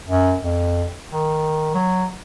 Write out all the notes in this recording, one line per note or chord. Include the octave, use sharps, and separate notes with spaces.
F#2
F2
D#3
F#3